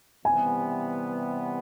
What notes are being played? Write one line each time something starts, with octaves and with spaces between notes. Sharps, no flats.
C3 E3 G3 B3 G#5